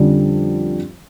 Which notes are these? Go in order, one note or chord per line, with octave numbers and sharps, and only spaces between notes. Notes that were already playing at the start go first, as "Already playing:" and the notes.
Already playing: F2 D3 G3 C#4